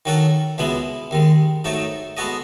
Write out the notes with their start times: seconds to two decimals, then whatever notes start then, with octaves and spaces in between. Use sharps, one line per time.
0.05 D#3 F#3 C#4 F#4 A4
0.58 C#2 B2 G#3 B3 E4
1.11 D#2 D#3 G#3
1.64 G#2 F#3 A3 D#4 A4
2.17 G#3 B3 F#4 A4 D#5